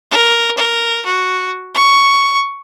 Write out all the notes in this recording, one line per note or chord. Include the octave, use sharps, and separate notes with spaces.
A#4
A#4
F#4
C#6